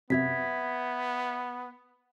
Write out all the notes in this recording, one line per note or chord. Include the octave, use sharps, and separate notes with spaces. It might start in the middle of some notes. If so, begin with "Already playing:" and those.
F#2 C3 B3 E5 G#6 B6